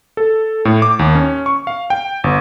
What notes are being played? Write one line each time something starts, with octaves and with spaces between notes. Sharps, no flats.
A4
A2
D6
D#2
C#4
C#6
F5
G5
G1